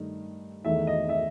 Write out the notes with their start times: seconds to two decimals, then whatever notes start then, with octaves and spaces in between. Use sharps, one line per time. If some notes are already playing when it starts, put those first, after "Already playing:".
Already playing: G2 D#3 A3
0.65 E2 D#3 A3 E5
0.87 D#5
1.09 E5